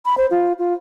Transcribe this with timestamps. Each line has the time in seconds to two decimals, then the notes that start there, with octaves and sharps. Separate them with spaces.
0.05 B5
0.18 C5
0.31 F4
0.59 F4